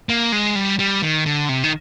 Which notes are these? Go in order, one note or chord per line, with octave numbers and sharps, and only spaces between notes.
A#3
G#3
G3
G3
D#3
D3
C3
D#3